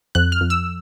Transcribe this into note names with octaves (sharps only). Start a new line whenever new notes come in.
F2 F#6
F6
F2
E6